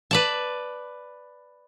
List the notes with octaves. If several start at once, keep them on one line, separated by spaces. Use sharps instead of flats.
B4 D5 A5